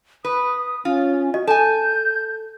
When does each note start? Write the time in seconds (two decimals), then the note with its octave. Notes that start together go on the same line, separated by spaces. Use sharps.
0.25 B4 D#6
0.85 C#4 F4
1.34 F#4 D#5
1.47 A4 G#5 A5 G6